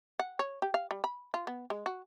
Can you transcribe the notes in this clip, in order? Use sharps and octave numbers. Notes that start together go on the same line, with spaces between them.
F#5
C#5
G4
F5
G3
B5
F4
B3
G#3
F#4